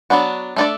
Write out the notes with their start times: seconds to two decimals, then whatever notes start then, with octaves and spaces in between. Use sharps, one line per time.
0.10 F#3 B3 D4 F#4
0.56 A3 D4 A4 D5